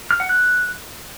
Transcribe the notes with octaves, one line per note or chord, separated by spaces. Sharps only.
F6
F#5
F#6